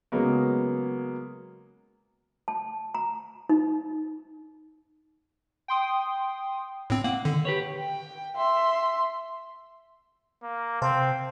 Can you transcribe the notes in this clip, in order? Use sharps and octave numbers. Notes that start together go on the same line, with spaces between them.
C#3 F#3 G#3 A#3 B3
A5
A#5
D#4
G5 C6 D#6
A2 C4
A#3 F#5
D3 D#3
G4 B4 C#5
G5
E5 C6
A#3
C3 C4 C5 F5 A5